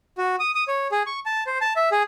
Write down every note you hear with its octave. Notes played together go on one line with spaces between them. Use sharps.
F#4
D#6
D#6
C#5
G#4
C#6
A5
C5
A5
E5
G#4